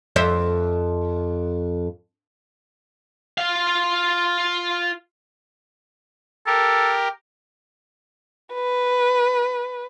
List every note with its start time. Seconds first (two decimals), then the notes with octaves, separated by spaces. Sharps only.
0.16 F2 C5 E5
3.38 F4 F5
6.47 G4 A4 A#4
8.54 B4